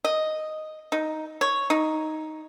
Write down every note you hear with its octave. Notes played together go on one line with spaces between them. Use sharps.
D#5
D#4
C#5
D#4